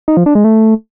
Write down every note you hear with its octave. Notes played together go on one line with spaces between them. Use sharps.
D#4
F3
D4
G#3
A3